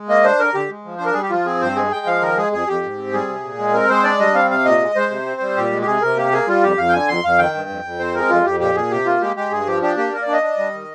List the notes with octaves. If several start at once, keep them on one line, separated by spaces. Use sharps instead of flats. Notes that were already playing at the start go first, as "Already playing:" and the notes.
Already playing: G#3
A#3 D#5
D4 C5
D3 A#4
D3 G4
G#3
F3
D4 C5
A#4
G3 G#4
G4
F3 F4
C4 G#4
G2 C5
G#3 G#4
G#3 G5
F3 F5
D#3 A#4
G#3 G#4
F2 G#4
F2 G4
G#2
C4
G3 G#4
C3
A#2
G#3
C4 A#4
G#3 C5
D4 D5
G3 D#5
C4 F5
C3 F5
A#2 D#5
G#3
G#3 C5
C3
C4
G3
A#2 G4
G#3
G4
C3 G#4
C3 A#4
A#3 G4
A#3 G#4
G3 F4
F2 G4
F2 F5
G5
D3 G#5
F2 C6
F2 F5
D#3 G5
G2
F2
F2
C4 C5
G#3 A#4
F2 F4
F2 G4
A#2 G4
A#2 G#4
C3 G4
A#3 F4
G#3 G4
G#3 G4
G2 G#4
F3 G4
D4 G4
A#3 G4
A#3 A#4
D5
D4
D#5
D4
G3
D#3